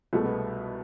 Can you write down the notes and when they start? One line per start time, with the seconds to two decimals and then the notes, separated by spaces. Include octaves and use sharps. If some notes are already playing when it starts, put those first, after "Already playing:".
0.13 C2 B2 G#3 A3
0.25 B3